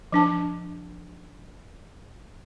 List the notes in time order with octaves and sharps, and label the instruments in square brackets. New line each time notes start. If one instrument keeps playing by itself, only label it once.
[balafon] F3 D4 A5